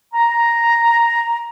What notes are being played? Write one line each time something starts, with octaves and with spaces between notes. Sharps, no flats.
A#5